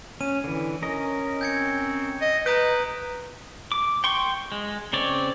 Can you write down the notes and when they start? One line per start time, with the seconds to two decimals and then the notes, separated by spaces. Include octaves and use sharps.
0.21 C#4 D#7
0.44 D3 E3
0.82 C#4 A#4 D#5
1.41 C4 G6 G#6 C#7
2.21 D#5
2.46 B4 A#5 D#6 G6 D7
3.72 D6
4.04 G5 C6 C#6
4.52 G#3
4.93 C#3 C4 C#5 D5